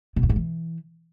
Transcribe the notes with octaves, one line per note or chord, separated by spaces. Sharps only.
B2
F2
G#2
E3